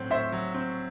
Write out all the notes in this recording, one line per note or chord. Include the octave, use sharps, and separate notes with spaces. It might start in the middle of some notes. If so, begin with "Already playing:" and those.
Already playing: A2 F#3 C4
A2 C5 E5
F#3
C4